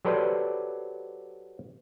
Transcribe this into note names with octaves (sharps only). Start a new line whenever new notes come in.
F#3 G4 A4 B4 C5 D5